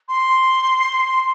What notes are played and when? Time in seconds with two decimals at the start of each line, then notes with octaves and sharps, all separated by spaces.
0.08 C6
1.06 C6